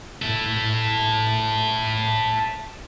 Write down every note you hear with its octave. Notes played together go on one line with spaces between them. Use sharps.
E4 A4